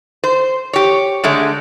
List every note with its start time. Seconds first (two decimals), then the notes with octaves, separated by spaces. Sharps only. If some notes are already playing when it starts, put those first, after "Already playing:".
0.24 C5
0.73 G4 C#5
1.24 D3 G#3 A3